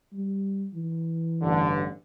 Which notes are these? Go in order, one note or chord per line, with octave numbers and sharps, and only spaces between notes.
G3
E3
A1 G2 D3